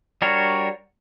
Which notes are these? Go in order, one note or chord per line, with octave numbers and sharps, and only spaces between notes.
G3 D4 F#4 A#4 C#5